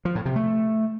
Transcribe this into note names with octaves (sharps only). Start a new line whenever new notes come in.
F3
A2
C3
A3